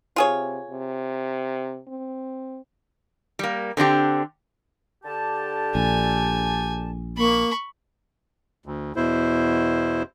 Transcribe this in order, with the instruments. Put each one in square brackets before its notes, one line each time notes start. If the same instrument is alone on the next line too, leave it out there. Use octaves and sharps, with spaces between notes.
[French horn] C3 [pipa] F4 G#4 C#5
[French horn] C3
C4
[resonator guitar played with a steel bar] G3 A#3
D3 C4 D4 G4
[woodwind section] D3 G4 A5
[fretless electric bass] A#1 [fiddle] G#5
[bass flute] A#3 [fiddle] B5 C#6
[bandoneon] D2
E2 B2 E4 C5